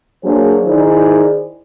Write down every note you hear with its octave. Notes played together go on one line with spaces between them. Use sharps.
F#3 A#3 D4 G#4 C5 C#5
D#3 D#4 E4 G#4 C5 D5